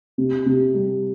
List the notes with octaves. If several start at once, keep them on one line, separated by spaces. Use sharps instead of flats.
C3
C3
G3